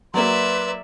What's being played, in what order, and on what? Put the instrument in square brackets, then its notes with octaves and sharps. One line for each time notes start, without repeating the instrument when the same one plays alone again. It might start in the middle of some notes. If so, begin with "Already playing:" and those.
[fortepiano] F#3 A#3 [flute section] B4 C6 [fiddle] D5 E5